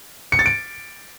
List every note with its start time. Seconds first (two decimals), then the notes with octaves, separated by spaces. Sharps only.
0.32 C#7
0.39 A6
0.46 D7